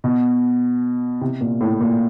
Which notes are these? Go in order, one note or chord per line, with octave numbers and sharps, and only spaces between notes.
B2
C3
A#2
A2
A#2